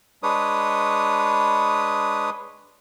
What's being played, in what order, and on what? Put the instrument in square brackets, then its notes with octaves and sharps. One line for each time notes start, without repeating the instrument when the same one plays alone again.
[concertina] G#3 D4 B4 C#5 D#6